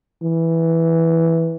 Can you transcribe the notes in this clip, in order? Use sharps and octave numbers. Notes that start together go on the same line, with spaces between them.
E3